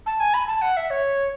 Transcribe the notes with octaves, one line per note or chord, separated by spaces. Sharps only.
A5
G#5
B5
A5
F#5
E5
C#5